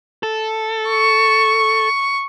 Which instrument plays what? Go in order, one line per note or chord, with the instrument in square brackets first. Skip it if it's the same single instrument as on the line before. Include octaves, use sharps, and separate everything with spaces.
[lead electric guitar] A4
[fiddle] C#6